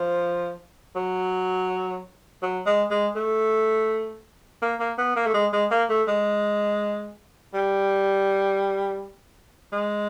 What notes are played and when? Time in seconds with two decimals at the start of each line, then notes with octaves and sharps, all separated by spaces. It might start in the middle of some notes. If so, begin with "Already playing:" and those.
Already playing: F3
0.96 F#3
2.42 F#3
2.66 G#3
2.90 G#3
3.15 A3
4.62 A#3
4.80 A#3
4.98 B3
5.16 A#3
5.26 A3
5.34 G#3
5.53 G#3
5.71 A#3
5.90 A3
6.08 G#3
7.54 G3
9.73 G#3